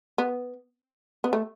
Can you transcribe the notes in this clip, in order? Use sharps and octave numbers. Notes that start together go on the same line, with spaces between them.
B3
B3
A3